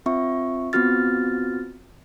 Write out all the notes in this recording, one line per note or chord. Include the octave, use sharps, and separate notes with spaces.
C4 F4 E5 C#6
B3 C4 F4 F#4 F6 A6